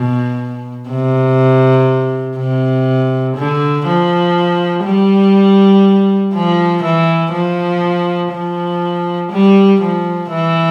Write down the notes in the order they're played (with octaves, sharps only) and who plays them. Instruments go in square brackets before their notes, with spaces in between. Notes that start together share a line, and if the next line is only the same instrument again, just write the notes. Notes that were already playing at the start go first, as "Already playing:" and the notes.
Already playing: [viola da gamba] B2
C3
C3
D3
F3
G3
F3
E3
F3
F3
G3
F3
E3